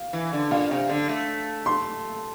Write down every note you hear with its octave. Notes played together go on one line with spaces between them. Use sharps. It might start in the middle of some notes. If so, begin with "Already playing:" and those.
Already playing: F5
E3
D3
A#2 F5
C3
D3
A3
C6